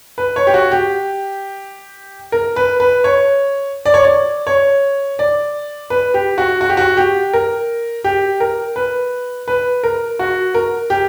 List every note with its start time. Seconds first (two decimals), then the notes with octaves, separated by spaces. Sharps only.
0.18 B4
0.36 C#5
0.47 G4
0.54 F#4
0.71 G4
2.32 A#4
2.56 B4
2.80 B4
3.04 C#5
3.86 D5
3.94 C#5
4.04 D5
4.47 C#5
5.19 D5
5.90 B4
6.14 G4
6.38 F#4
6.61 F#4
6.69 G4
6.77 F#4
6.97 G4
7.33 A#4
8.04 G4
8.40 A#4
8.76 B4
9.48 B4
9.83 A#4
10.19 F#4
10.54 A#4
10.90 G4